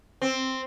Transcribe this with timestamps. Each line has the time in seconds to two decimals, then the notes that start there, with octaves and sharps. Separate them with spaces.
0.22 C4